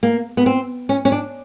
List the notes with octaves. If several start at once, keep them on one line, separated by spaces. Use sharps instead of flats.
A#3
B3
C4
C#4
C#4
D4